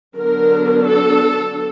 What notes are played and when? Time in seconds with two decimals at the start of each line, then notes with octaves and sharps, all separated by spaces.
0.18 D3 F#3 B3 D4 A#4
0.90 A4